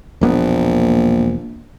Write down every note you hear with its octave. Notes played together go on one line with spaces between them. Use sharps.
E1 A#1 A#3 B3